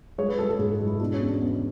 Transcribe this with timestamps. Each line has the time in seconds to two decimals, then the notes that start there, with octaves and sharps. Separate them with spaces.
0.18 G#3 C#5
0.28 B4
0.38 G#3 A4
0.49 A4
0.59 G#2 G#4
0.73 G#4
0.80 G#3
0.86 E4
1.00 B2 D4
1.14 C#4
1.21 E2
1.27 D4
1.41 E2